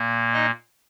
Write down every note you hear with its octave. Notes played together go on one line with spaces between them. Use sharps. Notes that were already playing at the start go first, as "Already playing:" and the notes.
Already playing: A#2 A#3
D#4 D#5